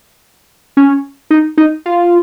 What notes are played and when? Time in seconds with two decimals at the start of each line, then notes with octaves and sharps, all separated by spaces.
0.77 C#4
1.31 D#4
1.58 D#4
1.86 F4